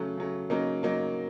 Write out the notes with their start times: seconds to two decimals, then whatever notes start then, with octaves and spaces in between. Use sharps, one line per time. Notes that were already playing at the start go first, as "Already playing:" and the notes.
Already playing: C#3 F#3 A3
0.17 C#3 F#3 A3
0.50 C#3 F#3 A#3 D#4
0.83 C#3 F#3 A#3 D#4